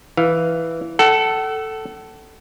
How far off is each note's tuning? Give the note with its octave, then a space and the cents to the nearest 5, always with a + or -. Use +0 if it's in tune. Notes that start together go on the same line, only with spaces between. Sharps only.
E3 +0 F5 +0
A4 +0 F#5 +40